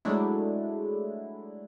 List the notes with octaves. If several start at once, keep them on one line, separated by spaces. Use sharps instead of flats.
F#3 G#3 A3 D4 E4